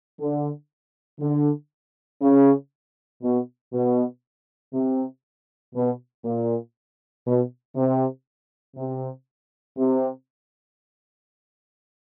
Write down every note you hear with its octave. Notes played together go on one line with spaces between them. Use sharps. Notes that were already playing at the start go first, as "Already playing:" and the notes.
D3
D3
C#3
B2
B2
C3
B2
A#2
B2
C3
C3
C3